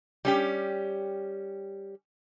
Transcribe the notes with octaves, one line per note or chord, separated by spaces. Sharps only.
G3 C#4 G4